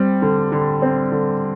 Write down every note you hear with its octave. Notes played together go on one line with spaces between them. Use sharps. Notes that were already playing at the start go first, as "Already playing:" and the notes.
Already playing: G3 C4
D3
D3
C4
D3